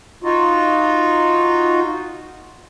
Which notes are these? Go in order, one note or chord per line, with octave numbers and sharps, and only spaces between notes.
D#4 F4 F#4